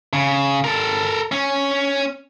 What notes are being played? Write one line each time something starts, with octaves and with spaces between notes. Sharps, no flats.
C#3
A4 A#4
C#4